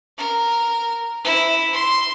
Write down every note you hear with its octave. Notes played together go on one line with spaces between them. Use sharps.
A#4
E4
C6